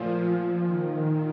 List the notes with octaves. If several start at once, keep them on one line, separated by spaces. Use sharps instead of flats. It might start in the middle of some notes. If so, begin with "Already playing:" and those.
Already playing: A#2 F3 A3
D#3